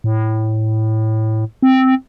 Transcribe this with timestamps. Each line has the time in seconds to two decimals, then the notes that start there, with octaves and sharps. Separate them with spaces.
0.04 A2
1.63 C4